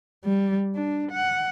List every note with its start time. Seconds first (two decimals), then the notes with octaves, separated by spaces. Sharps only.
0.24 G3
0.75 D4
1.11 F#5